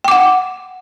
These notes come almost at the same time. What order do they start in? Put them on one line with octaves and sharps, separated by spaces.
G5 D6 F#5